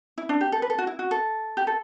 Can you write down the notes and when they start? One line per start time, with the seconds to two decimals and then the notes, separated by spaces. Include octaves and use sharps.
0.18 E4
0.29 D4
0.41 G4
0.52 A4
0.62 B4
0.70 A4
0.78 F#4
0.87 E4
0.99 F#4
1.11 A4
1.57 G4
1.67 A4